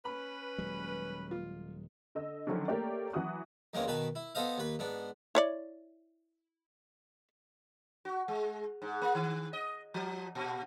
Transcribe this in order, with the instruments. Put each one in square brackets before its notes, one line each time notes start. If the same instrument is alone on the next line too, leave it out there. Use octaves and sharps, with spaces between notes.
[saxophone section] C#4 B4 [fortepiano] B5
[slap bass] D#1 F#3 G#3
[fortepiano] F4
[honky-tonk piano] D3 D#5 E6
D3 D#3 F3 F#3 C#4 D4
A3 A#3 G4 A#4 C#5 D5
E3 F#3 F#4 D#6 F#6
[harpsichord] E2 G#3 A#3 C4 C#4
B2 D#3 B4 A5
E4
B3 A4 C5 D#5 F5
D#2 B4
G#2 B3 D4
[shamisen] E4 C#5 D5
[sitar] F#4
G#3
G#2
A#3
D#3
D#5
F3
A#2